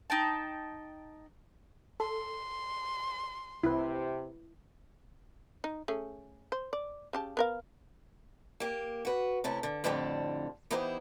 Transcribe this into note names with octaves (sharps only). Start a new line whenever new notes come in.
D#4 G5 A5
A4 C6
C2 C3 E4 B4
D#4
A3 C#4 G#4
C5
D5
C#3 G4 A5
B3 A#4 F5
A#3 G4
F#4 B4
C3 A3 C#4 E4
D3
F2 A2 D3 G3 B3 C4
E3 B3 D#4 E4 G4 C5